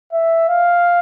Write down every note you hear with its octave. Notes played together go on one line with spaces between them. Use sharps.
E5
F5